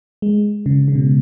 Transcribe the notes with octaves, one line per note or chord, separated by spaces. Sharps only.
G#3
C#3
C#3
B2